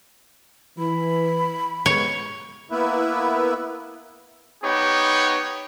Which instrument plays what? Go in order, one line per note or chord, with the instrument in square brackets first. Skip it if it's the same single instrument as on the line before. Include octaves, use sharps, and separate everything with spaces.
[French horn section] E3 [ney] B5
[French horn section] G#3 B3 [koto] C#5
[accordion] A#3 B3 E4 B4 E5
[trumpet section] B3 D#4 G4 C#5